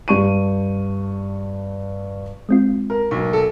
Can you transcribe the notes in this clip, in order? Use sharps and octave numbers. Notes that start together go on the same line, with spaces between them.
G2 C#6 D#7
G#3 C4 F4
A#4
B1 A#3 C#6
A4